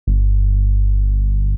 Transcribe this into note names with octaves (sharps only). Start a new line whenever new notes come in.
G1